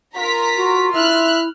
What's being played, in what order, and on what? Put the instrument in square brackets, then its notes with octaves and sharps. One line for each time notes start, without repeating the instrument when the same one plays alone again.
[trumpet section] F4 C6 [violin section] A#4 A#5 B6
[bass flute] F#4
[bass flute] E4 [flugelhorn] E5 [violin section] F6 F#6